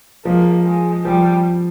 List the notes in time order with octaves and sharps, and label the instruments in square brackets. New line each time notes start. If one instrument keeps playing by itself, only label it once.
[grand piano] F3 G#3 [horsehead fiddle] A#3
[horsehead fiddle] G#3
[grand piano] F3 [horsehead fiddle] G3